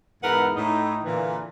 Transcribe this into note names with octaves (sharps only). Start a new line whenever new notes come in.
E2 G#2 E4 A#4 B4 F#5
A2 D#4
A#2 D3 E3